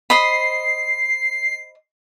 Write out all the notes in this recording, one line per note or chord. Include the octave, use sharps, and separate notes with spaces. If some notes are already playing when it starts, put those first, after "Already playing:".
C5 D#5 B5 C7